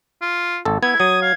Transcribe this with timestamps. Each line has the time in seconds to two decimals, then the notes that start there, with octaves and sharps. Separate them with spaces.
0.22 F4
0.65 G#1 A4
0.83 B3 E4 G#6
1.00 F#3 D#6
1.22 F5